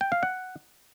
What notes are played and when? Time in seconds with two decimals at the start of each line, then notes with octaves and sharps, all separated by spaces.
0.01 G5
0.12 F5
0.23 F#5